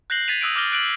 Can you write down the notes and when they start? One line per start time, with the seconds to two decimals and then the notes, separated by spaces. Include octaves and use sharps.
0.10 F#6 G6 A#6 C7 F#7 G7
0.28 G#6 A6 B6 D#7 F7
0.41 D#6 E6 F#6 D7
0.56 D6 F6 A#6 G7
0.72 F#6 D7 F#7